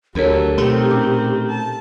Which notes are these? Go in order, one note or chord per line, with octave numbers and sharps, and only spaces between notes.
D2 F#3 D4 G4 A4 A#4 C#5
B2 D#3 A3 C4 A4
A#2 C#4 D6
A5